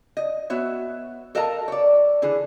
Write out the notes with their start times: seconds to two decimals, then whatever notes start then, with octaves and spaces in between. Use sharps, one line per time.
0.17 D#5
0.50 B3 F#4 C#5 E5
1.35 A4 A#4 D#5 F5 A5 A#5
1.68 C#5 D5
2.22 D3 E3 G#4